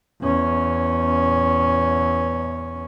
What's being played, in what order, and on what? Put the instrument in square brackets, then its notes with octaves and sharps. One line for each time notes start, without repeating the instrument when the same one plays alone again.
[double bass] E2 C#4